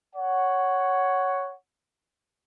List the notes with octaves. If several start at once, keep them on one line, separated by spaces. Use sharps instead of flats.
C#5 F#5